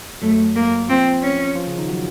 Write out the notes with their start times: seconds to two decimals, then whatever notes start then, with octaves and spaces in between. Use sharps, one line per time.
0.22 F#2 F#3 A3
0.56 A#3
0.89 F3 C4 F4
1.23 C#4
1.55 F3 F4
1.67 C#3 C#4
1.78 D#3 D#4
1.88 F#3 F#4